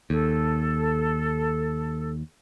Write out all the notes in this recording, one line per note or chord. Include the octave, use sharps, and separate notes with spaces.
D#2 A4